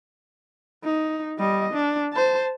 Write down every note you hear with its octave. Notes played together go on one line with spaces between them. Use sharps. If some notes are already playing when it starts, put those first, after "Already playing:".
D#4
G3 D#5
D4
C5 A5